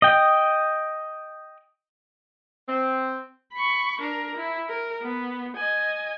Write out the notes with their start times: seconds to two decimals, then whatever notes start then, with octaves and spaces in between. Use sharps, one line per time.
0.02 D#5 G5
2.69 C4
3.53 B5 C#6
4.01 D4 A#4
4.37 E4
4.69 A#4
5.02 B3
5.56 D#5 G#5